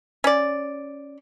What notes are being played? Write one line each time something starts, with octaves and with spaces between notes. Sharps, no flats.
C#4 D5